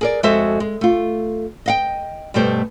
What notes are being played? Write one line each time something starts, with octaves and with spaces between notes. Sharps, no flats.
G#4 A#4 D5
F2 G#3 F#4 A4 C5 E5
G#3
A3 F4
D#5 F5 G5
G2 B2 G3 A3 G4 C5